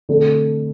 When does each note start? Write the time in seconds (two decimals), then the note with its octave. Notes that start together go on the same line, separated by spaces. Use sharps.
0.09 D3 A3 C4